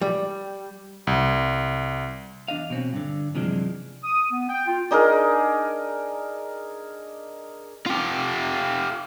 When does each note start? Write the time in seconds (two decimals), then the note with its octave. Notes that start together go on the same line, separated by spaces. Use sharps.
0.01 G3
1.07 C2
2.48 E2 D4 D#5 F5
2.70 B2 C4 C#4
2.93 G2 D3
3.35 F#2 C3 E3 F3 G#3 D4
4.04 D#6
4.30 B3
4.50 G5
4.67 F4
4.91 D4 D#4 G#4 A#4
7.87 F4 G4